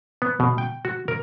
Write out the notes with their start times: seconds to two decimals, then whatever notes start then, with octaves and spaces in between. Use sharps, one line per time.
0.22 B3
0.40 B2
0.58 G5
0.85 F#4
1.08 A#4